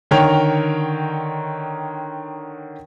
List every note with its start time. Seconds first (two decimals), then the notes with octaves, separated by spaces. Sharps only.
0.11 D3 D#3 A#4 C#5 G5 F7